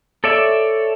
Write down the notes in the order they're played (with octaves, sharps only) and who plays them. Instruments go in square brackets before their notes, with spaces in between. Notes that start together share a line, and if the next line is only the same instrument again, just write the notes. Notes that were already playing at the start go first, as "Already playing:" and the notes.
[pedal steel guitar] A4 C#5 D5 E5